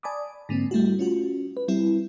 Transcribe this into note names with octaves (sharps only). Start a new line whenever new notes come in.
D5 G#5 A5 B5 D6 D#6
G#2 D3 A#3 C4
G3 A3 E4 F#4
C#4 F4 F#4
B4
G3 C4 E4